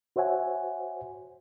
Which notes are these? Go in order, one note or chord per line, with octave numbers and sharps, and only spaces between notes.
F#4 C5 C#5 E5 F#5 G#5